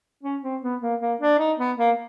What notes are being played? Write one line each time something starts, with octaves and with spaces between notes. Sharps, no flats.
C#4
C4
B3
A#3
A#3
D4
D#4
B3
A#3